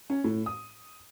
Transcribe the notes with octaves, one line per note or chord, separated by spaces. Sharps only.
C#4
A2
D#6